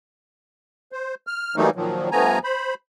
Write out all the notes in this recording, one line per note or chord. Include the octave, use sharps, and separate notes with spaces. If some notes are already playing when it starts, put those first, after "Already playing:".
C5
F6
E3 F#3 G3 A3 A#3 D#4
A#2 D#3 F3 F#3
G2 F3 A3 B3 G#5 A#5
C5 B5